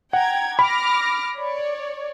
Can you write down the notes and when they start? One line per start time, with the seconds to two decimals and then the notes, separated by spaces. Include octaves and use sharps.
0.13 F#5 G5 A#5 G#6
0.59 B5 D6 F6 A#6
1.36 C#5 D5